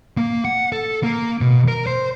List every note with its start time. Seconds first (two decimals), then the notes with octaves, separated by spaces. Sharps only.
0.17 A#3
0.45 F#5
0.72 A4
1.03 A#3
1.41 B2
1.68 A#4
1.87 C5